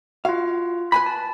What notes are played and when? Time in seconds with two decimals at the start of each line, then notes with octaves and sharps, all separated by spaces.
0.25 F4 F#4 F5
0.92 B4 G#5 B5
1.06 A5